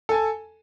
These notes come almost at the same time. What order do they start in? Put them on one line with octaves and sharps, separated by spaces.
A4 G#5 A5